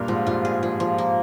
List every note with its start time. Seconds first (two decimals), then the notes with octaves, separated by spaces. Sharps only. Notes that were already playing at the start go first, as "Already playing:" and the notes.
Already playing: G2 A#2 A#4
0.08 G#2 F3
0.27 G2 F4
0.45 G#4
0.63 F3
0.80 F3
0.98 A#3